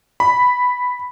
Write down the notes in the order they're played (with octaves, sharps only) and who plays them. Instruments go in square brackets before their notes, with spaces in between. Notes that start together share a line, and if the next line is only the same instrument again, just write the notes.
[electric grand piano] B5